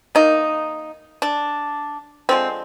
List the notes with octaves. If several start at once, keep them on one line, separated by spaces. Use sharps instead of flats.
D#3 A#3 D#4
D4
D3 F3 G#3 C4